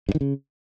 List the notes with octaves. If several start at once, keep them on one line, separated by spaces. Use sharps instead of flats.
G2
D#3
C#3